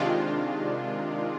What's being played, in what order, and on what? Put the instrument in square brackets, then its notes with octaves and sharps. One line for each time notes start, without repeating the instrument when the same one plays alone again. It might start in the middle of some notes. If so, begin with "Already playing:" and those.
Already playing: [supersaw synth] C3 D#3 G#3 D4 F4